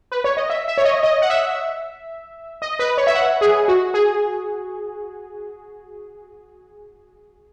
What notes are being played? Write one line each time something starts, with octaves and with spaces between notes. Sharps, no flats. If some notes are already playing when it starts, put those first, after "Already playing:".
B4
C#5
D#5
E5
E5
C#5
D#5
D#5
F#5
E5
D#5
B4
C#5
E5
F#5
G#4
F#4
G#4